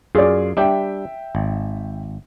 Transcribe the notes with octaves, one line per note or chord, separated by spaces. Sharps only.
F#2 F4 G#4 D5
G3 D4 G4 E5 G5
G#1